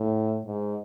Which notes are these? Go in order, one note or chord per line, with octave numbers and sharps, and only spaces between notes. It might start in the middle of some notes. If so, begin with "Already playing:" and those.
Already playing: A2
G#2